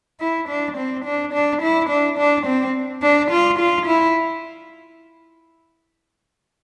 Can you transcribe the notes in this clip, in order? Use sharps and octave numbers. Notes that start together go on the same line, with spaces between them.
E4
D4
C4
D4
D4
E4
D4
D4
C4
D4
F4
F4
E4